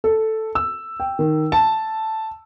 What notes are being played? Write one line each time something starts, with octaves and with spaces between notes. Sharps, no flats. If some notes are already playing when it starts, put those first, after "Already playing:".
A4
E6
G5
D#3
A5